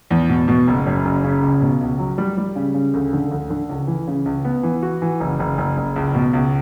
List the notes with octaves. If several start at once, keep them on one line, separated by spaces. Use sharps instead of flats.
E2
B2
B2
F#1
F#2
F#1
C#3
C#2
B2
C#2
F#3
G3
G3
C#3
C#3
D2
D3
D2
D3
C#2
E3
C#3
C#2
B3
E3
F#4
E3
F#1
F#1
F#1
F#1
C#2
B2
C#2